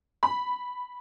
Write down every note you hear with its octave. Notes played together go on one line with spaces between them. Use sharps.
B5